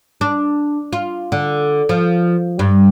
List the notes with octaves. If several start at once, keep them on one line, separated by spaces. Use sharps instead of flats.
D4
F4
D3
F3
G2